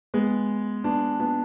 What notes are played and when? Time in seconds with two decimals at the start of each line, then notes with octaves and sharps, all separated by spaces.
0.14 G#3 B3
0.84 B3 D4
1.20 B3 D4